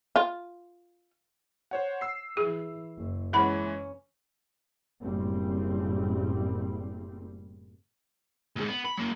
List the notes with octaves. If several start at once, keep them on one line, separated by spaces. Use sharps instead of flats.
F4
C5 C#5 F#5
E6 C7
E3 G#4
F#1
E3 G#3 C#4 B4 F#5 B5
F#1 A2 G3 C4
D2 G#2
B3
B5
F#3 A#3